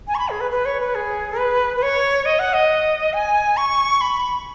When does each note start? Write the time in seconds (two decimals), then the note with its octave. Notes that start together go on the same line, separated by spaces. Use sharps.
0.08 G#5
0.15 C#6
0.18 B5
0.29 G#4
0.40 B4
0.51 B4
0.65 C#5
0.81 B4
0.95 G#4
1.38 B4
1.76 B4
1.82 C#5
2.25 D#5
2.39 F#5
2.53 D#5
3.13 G#5
3.57 C#6
4.01 B5